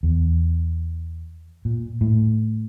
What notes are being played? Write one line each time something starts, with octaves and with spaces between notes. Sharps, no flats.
E2
A#2
A2